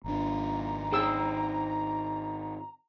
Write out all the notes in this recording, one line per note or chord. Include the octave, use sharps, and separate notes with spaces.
G#1 D4 A#5
D#4 G#4 C5 G5 E6